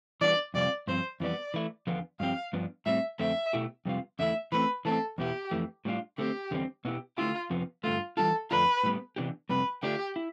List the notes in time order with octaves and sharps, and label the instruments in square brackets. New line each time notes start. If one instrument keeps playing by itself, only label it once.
[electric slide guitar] E3 G3 B3 D4 [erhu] D5
[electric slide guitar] F2 C3 G3 C4 F4 [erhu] D5
[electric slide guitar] G2 F3 C4 [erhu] C5
[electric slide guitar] F2 E3 G3 B3 [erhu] D5
[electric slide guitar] E3 A3 E4
E2 D3 F3 B3 F4
[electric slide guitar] G2 F3 C4 G4 [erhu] F5
[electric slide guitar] G2 F3 B3 D4
[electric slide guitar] A2 G3 C4 [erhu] E5
[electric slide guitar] F2 D3 A3 C4 [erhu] E5
[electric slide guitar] B2 A3 E4 G4
F2 C3 G3 B3 F4
[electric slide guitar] E2 D3 A3 E4 [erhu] E5
[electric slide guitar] E3 A3 C4 [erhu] B4
[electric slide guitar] E3 A3 C4 [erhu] A4
[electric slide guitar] E2 B2 B3 E4 [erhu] G4
[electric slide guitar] F2 E3 A3
A2 G3 D4 F4
[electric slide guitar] D3 A3 C4 [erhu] G4
[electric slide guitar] E2 D3 G3 C4
B2 B3 E4 G4
[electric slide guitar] D3 A3 E4 G4 [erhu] F4
[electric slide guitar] F2 C3 F3 B3
[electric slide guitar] G2 D3 A3 [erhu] F4
[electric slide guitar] E3 G3 D4 F4 [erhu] A4
[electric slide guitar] F2 D3 A3 D4 F4 [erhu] B4
[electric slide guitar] A2 G3 B3
C3 E3 B3 D4 G4
[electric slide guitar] F2 C3 G3 B3 [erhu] B4
[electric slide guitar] D3 A3 D4 F4 [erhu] G4
[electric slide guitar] E4